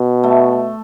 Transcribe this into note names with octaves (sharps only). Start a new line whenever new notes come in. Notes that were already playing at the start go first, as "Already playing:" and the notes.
Already playing: B2
A3